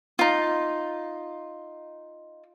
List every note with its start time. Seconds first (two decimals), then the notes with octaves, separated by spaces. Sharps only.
0.19 D#4 F4